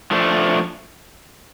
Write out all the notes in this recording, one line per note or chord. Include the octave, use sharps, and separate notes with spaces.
F3 A3 D4